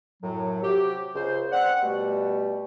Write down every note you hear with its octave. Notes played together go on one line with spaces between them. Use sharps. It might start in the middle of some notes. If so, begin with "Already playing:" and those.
F#2 A2 F#3
C3 F#3 G4
C#2 C5
C4 D5 F#5
B2 G3 A3